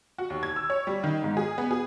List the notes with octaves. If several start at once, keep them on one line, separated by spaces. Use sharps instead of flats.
F#4
D#2
G#6
E6
C#5
G3
D#3
G#2
G#4
B3
G#4